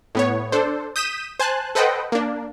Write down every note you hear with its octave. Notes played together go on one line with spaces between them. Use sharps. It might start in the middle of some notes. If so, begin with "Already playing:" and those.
A2 B3 C#5
D4 A4 C5
D#6 G6 B6 D#7 E7
C5 G#5 A5 F#6
A4 B4 C5 D#5 F#5 G5
A#3 D4